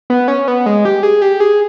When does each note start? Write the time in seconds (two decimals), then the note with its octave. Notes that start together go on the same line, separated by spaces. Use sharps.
0.10 B3
0.28 C#4
0.48 B3
0.66 G#3
0.85 G4
1.03 G#4
1.22 G4
1.40 G#4